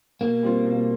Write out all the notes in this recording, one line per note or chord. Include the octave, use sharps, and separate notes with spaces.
B2 A#3
G3 C4 F4
B2